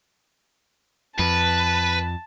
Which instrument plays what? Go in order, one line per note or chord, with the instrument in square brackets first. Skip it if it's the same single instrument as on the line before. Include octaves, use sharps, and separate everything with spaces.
[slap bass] F2 [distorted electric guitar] B4 [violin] A5